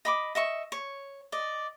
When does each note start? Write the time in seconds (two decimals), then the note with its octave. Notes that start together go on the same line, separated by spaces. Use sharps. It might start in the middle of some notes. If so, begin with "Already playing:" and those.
0.05 D#5 B5 D6
0.35 D#5 E5 C#6
0.72 C#5
1.32 D5 D#5